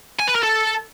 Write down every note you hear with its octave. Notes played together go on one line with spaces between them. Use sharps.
G#5
B4
A#4
A4